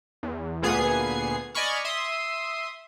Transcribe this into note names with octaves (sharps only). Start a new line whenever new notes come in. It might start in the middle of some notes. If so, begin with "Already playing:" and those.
E2
D2 A#2 B3 G#4 G#6 C7
D5 D#5 G#5 B5 C#6 F6
E5 C6 D#6